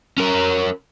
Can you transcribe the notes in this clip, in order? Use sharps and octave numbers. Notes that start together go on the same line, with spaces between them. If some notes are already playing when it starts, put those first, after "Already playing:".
C#4 A#4